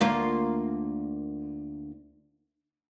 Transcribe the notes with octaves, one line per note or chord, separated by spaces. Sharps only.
D2 A#3 F4